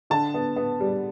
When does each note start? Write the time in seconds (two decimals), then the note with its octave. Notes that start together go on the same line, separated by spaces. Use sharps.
0.10 D3 A5
0.34 B3
0.56 B3
0.80 G3